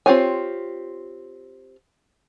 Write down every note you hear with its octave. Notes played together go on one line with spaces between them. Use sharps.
C4 F4 G4 C#5 G#5